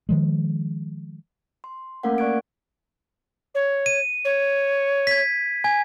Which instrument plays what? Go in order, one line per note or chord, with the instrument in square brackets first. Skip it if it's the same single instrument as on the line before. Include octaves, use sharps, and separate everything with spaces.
[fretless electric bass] D#3 F3 G#3
[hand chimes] C6
A3 A#3 C#4 A#4 F5 F#5
D5 C#6 F#6 G#6 D7
[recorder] C#5
[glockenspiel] D#7
[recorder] C#5
[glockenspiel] G#6 B6
G#5 G#6